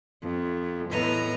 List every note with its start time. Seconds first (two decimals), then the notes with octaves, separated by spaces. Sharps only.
0.22 F2
0.90 E2 A2 B3 D#5 A#5